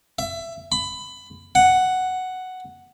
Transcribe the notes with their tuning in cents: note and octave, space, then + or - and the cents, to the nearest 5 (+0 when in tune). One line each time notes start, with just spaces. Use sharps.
E5 +20
B5 +20
F#5 +5